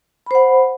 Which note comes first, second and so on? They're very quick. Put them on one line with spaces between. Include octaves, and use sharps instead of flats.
B5 C5 F#5